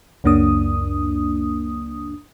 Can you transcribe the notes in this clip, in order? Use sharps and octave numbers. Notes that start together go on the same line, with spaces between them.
C#2 F#2 A#3 D4 D#6